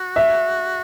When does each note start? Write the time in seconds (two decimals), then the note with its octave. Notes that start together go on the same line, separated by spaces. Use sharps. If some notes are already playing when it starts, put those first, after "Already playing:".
Already playing: F#4
0.16 E5